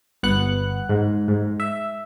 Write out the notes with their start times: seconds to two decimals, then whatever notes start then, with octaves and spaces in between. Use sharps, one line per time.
0.23 G1 B3 F#5 F#6
0.89 G#2
1.28 G#2
1.60 E5